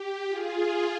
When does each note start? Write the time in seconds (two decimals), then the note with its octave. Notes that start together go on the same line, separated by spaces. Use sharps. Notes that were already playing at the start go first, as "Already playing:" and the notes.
Already playing: G4
0.28 F4 G#4